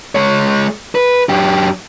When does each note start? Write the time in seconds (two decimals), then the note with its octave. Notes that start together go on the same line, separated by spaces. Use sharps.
0.15 G#3 C#5
0.95 B4
1.29 F#2 G4